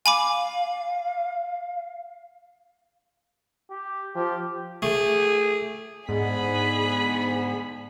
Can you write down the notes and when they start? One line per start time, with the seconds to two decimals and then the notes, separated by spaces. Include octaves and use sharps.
0.06 F5 G#5 B5 D6
3.71 G4
4.15 F3 G4
4.82 A3 G#4
6.09 G#2 D3 B3 G#4 B5